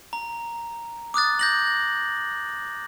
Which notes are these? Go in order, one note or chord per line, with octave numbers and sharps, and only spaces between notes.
A#5
D6 D#6 F#6 A6
G6 A#6 F#7